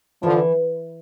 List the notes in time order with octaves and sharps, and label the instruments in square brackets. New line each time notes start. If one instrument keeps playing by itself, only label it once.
[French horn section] D3 F3 [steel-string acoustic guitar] E3